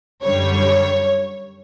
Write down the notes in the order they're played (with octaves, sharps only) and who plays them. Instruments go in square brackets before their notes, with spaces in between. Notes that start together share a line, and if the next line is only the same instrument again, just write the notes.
[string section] F#2 D3 G3 C#5